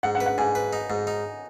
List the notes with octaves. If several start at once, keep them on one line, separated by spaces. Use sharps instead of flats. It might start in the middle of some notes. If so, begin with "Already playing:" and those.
G#2 F#5
F#5
B4
F#5
G#2 G#5
B4
D#4
G#2
D#4